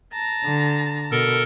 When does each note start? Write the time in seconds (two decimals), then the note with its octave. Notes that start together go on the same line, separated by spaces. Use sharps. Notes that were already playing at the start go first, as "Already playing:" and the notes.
0.13 A5 A#5
0.44 D3
1.11 B2 A4 A#4